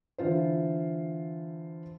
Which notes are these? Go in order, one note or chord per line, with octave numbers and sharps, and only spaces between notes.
D3 E3 F4 C5